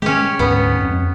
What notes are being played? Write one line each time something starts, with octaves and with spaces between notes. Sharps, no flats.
G#3 C#4 G4
D2 G#2 B3
F2